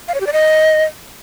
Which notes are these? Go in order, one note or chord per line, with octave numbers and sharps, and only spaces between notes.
F5
C#5
G4
D5
D#5